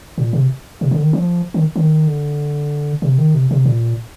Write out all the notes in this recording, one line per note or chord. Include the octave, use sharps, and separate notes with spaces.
A#2
C3
C3
D3
D#3
F3
D#3
D#3
D3
C3
D#3
C3
C3
A#2